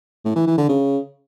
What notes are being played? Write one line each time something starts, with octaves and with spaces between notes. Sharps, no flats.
A2
E3
E3
D3
C#3